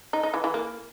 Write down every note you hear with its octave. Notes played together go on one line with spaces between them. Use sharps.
D#4
D#4
E3
E3
A#3